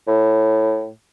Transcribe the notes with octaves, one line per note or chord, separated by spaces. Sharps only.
A2